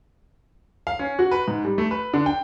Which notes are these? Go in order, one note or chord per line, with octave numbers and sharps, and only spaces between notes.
F5
C#4
F#4
B4
G#2
G3
A3
B4
D3
G5